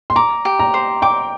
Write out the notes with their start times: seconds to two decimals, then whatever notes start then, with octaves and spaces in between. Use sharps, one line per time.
0.10 C6
0.16 A#5 D6
0.45 G4
0.59 A#5
0.74 C5
1.02 G5 D6